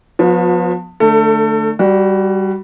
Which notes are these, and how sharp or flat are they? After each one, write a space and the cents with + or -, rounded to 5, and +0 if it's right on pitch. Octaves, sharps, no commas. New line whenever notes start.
F3 +35 B3 +0 F#4 -45
D3 +20 A3 +0 A4 +30
G3 +0 F#4 +25